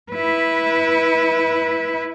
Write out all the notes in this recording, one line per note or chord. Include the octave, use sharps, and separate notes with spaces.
E4 B4